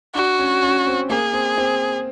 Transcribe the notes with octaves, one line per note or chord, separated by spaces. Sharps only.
D4 F#4
C#4
C#4
C4
A#3 G#4
C4
C4